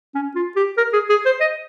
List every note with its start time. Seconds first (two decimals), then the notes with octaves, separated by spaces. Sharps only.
0.15 C#4
0.35 F4
0.56 G4
0.77 A#4
0.93 G#4
1.10 G#4
1.25 C5
1.41 D#5